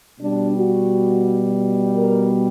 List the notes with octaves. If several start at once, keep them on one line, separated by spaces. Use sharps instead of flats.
B2 G3 D4
F#4
A#4